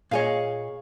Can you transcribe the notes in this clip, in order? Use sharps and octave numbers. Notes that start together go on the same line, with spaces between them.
A#2 G#4 C#5 D#5 F5